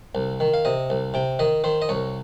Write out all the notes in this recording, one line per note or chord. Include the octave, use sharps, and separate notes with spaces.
C2
D#3
F5
C3 D#5
C2
C3 G5
D#3 D#5
D#3 C5
D#5
C2 C#5